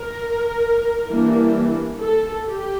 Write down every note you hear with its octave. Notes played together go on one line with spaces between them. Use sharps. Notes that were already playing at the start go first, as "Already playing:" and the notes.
Already playing: A#4
E3 G3 A#3 D4
A4
G4